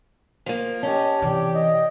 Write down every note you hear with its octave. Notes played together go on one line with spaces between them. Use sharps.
F3 A#3
C#4 G4 D#5 A5
C3 E3 G4 D5
D#5